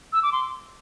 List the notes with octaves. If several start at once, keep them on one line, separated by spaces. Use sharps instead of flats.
E6
D6
C6